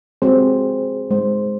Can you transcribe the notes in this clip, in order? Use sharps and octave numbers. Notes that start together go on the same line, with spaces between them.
G#3 C4 F#4 G#4 C5 C#5
G#3 C5